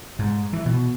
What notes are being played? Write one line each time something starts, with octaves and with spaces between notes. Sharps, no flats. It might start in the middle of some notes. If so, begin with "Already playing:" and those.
G#2
E3
B2